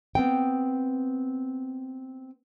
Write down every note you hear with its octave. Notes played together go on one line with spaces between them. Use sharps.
B3 C4 G5